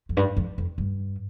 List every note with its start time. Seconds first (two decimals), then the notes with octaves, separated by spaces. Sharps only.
0.09 F2
0.17 G2
0.37 F2
0.58 F2
0.78 G2